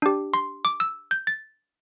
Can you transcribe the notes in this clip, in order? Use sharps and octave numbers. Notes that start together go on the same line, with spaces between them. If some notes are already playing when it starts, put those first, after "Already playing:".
D4 G4
C6
D6
E6
G6
A6